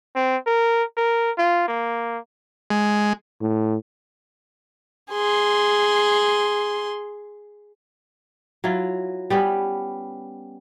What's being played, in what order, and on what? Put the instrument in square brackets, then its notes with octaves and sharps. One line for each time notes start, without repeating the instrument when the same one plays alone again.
[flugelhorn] C4
A#4
A#4
F4
A#3
[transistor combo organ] G#3
[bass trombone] A2
[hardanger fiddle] G#4 C6
[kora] F#3 E4 F4
G3 B3 C#4